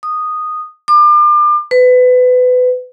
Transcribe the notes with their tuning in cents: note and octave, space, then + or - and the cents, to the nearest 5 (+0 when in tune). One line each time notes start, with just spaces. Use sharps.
D#6 -10
D6 +35
B4 +25